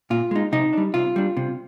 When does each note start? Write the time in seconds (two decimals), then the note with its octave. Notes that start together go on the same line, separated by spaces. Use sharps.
0.10 A#2 F4
0.31 G#3 D#4
0.52 C3 D#4
0.73 G3 D4
0.94 C3 F4
1.16 G3 D4
1.37 C3